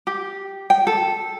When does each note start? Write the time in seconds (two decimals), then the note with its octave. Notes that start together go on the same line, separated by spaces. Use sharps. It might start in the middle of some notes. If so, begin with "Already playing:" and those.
0.07 G4
0.70 G5
0.87 A4